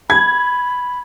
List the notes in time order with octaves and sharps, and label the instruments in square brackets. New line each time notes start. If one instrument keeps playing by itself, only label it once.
[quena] B5 [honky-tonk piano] G#6